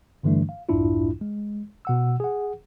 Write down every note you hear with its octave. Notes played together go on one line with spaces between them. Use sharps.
G2 D3 E3 G3 A3 D4
F5
B1 F2 G#2 D4 E4 F4
G#3
B2 F#5 E6
G#4 F#5